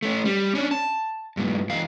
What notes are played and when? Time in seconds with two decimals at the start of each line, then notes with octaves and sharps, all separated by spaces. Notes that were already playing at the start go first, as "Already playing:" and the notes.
0.03 A3 C#4
0.25 G3
0.55 C#4 D4
0.71 A5
1.37 G2 A#2
1.69 E2 F5